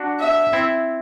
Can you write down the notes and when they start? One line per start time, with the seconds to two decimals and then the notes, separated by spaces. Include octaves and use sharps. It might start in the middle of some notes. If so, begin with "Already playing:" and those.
Already playing: D4 F#4
0.19 E5
0.53 C4 E4